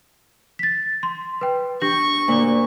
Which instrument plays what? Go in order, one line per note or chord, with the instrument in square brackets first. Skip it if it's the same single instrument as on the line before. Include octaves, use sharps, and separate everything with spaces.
[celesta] A6 B6
C6
B4 G5
[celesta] D4 G4 A#6 [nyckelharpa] C#6
[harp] D2 A#2